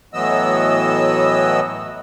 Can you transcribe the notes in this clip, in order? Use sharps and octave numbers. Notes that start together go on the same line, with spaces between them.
A2 E3 F#3 B3 D#5 E6